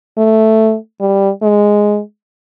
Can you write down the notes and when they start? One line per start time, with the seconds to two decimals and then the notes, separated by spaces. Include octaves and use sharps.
0.18 A3
1.01 G3
1.42 G#3